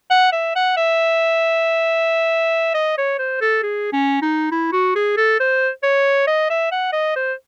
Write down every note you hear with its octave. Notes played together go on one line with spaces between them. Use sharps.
F#5
E5
F#5
E5
D#5
C#5
C5
A4
G#4
C#4
D#4
E4
F#4
G#4
A4
C5
C#5
D#5
E5
F#5
D#5
C5